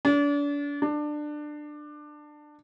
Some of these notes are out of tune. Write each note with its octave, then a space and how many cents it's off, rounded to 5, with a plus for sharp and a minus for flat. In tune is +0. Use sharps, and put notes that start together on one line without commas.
D4 -35
D4 +20